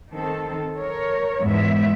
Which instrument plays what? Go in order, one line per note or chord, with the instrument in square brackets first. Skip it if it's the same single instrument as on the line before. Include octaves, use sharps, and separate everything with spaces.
[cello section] D#3 C4 A4
A#4 C#5
E2 G#2 G#3 B3 E5